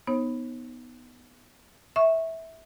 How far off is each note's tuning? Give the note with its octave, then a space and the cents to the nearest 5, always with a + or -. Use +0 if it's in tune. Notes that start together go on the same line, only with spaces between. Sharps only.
B3 +0 D#4 +0 C#5 -45
E5 -15 C#6 -10